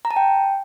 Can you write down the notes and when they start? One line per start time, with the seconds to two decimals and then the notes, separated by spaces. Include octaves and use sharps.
0.05 A#5
0.11 A5
0.16 G5